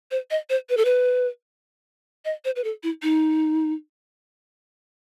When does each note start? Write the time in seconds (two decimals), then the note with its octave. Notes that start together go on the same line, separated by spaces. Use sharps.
0.11 C5
0.31 D#5
0.50 C5
0.69 B4
0.77 A4
0.85 B4
2.25 D#5
2.45 C5
2.56 B4
2.64 A4
2.83 E4
3.03 D#4